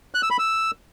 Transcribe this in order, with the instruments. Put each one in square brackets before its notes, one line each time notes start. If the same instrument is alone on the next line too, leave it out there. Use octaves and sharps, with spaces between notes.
[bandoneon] F#6
E6
B5
E6